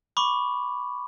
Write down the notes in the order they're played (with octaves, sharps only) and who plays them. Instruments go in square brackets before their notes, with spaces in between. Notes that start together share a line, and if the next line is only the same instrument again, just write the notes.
[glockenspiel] B5 C#6 D6